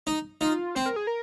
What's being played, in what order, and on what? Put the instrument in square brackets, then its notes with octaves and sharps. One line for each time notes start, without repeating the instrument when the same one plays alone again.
[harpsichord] D#4
[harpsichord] D#4 [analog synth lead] F4
[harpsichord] C4 [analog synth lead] C5
[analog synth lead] A#4
G#4
A#4